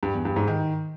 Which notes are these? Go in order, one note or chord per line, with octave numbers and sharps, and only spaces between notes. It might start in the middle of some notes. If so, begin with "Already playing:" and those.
G2
E2
G2
G#2
D#3